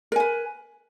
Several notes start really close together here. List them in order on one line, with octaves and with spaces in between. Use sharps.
A#4 G#5 B4